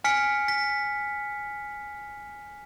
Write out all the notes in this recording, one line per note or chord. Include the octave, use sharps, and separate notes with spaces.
G#5 F6 B6 C#7
B6